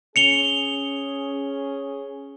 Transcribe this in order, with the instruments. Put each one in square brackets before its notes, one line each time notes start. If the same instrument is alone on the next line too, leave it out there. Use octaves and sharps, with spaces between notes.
[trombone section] C#4 G#4 [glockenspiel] C#7 F7 G7